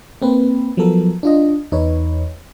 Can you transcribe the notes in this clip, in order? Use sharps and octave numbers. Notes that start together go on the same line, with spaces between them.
A#3 C4 B4
F3 F#3 B3 A4 A#4
D4 F4 D#5
E2 D#4 B4 C#5